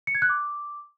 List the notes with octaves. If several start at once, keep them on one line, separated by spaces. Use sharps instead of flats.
C#7
G#6
F#6
D6